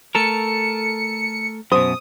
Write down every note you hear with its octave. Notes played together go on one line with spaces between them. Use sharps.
A3 A4 A#4 C#7
F#2 B2 C5 D#6